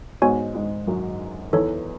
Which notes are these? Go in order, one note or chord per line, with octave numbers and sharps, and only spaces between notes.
G#2 G#3 B3 F#4 C#5 G#5
G#2 G#3
F#2 F#3
E2 E3 D#4 A4 C#5